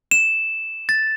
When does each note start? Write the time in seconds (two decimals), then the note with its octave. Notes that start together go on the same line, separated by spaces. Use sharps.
0.11 E7
0.89 A6